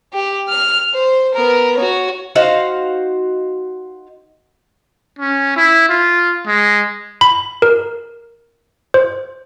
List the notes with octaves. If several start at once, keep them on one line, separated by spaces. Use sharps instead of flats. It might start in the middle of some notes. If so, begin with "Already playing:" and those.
G4
F6 F7
C5
B3 A#4
F#4 C#5
D#4 F#4 C5 F5
C#4
E4
F4
G#3
B5
A#4
C5